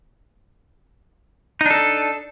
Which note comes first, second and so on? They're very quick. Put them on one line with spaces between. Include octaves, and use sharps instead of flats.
D#4 D4 A4